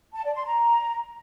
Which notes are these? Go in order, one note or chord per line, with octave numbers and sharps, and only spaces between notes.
A5
D5
C6
A#5